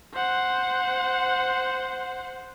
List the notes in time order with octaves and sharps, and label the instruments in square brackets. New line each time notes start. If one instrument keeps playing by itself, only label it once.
[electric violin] C5 F#5